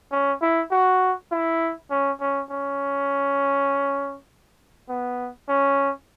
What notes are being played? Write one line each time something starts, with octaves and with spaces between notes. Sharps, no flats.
C#4
E4
F#4
E4
C#4
C#4
C#4
B3
C#4